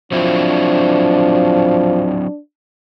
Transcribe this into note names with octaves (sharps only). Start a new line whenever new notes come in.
F3 F#3 C4 D4 E4